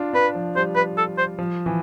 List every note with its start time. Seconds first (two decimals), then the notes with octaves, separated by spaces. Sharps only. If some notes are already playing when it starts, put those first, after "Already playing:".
Already playing: D4 F4
0.13 D4 B4
0.35 F3
0.55 G3 C5
0.76 B4
0.97 A4
1.18 C5
1.39 F3
1.66 E3